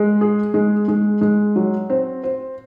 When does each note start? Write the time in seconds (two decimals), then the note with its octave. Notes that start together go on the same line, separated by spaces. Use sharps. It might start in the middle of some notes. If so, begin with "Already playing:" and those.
Already playing: G#3
0.21 G#4
0.54 G#3
0.88 G#3
1.21 G#3
1.56 F#3
1.90 C4
2.24 C5